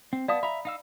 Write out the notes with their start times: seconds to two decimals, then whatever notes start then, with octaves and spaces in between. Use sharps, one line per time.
0.13 C4
0.28 B3 D5 F5 A5 D#6
0.43 E5 A#5 B5
0.65 D#4 F5 E6